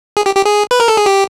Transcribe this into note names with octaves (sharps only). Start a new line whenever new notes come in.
G#4
G4
G4
G#4
B4
A#4
A4
G#4
G4